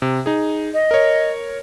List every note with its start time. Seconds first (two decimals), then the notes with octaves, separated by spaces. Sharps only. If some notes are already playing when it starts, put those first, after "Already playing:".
0.02 C3
0.26 D#4 G#4
0.74 D#5
0.91 A#4 C#5